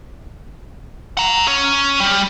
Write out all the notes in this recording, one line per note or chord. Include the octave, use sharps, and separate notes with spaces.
F#5 A#5
C#4 C#5
G3